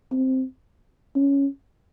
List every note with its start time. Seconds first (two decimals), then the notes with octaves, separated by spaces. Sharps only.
0.12 C4
1.15 C#4